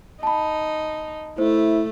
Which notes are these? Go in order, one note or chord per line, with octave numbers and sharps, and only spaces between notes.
D#4 A5 B5
A3 E4 C5